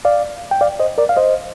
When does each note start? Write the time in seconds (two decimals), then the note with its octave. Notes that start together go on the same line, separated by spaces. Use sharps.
0.05 D5 F5
0.51 G5
0.61 D5 F5
0.80 C5 D#5
0.98 A#4 D5
1.09 F5
1.17 C5 D#5